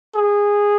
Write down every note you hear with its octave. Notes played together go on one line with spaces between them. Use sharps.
G#4